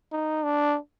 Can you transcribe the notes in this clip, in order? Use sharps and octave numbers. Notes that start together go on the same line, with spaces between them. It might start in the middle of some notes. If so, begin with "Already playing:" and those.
D#4
D4